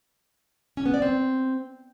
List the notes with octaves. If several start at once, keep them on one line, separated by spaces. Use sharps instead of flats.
C#4
B3
D5
C4